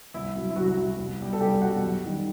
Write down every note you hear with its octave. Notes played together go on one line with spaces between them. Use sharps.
C2 E4
C3 F#3
E4
C2 F#3 F#4
C3 F#3
C2
B2 G3
A4
C2 G3 G4
B2 G3 F#4 F#5
F#2
D#3 G3